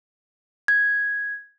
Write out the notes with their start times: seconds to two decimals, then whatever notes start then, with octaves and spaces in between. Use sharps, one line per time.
0.68 G#6